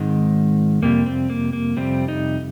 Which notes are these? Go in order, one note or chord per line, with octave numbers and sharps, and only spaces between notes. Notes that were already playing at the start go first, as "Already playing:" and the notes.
Already playing: G#2 D#3 G#3 C4
F2 C3 G3 A#3
C4
A#3
A#3
F2 C3 G3 C4
D#4